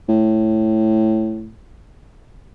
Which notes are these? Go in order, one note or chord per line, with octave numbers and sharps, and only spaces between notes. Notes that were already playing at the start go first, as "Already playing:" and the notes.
A2